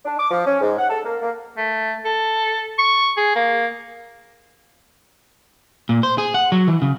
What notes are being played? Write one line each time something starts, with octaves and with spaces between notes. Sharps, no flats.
D4
D6
F3
C#4
G#2
F#5
A4
A#3
A#3
A3
A4
C#6
G#4
A#3
A#2
C5
G#4
F#5
F#3
E3
C#3